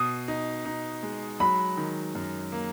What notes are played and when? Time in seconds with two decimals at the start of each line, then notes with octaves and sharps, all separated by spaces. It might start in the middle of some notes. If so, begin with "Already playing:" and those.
Already playing: B2 D#6
0.28 D#4
0.65 D#4
1.03 G#3
1.40 F#3 B5
1.78 D#3
2.15 F#2
2.52 A#3